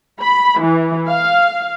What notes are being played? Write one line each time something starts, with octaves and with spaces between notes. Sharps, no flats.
B5
E3
F5